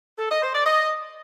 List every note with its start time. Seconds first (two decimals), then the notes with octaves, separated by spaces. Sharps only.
0.19 A4
0.30 D#5
0.42 C5
0.54 D5
0.66 D#5